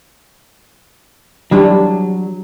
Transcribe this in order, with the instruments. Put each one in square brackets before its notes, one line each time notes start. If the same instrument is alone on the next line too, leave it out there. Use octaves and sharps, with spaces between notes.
[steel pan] E3 G3 D4 [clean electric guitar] F#3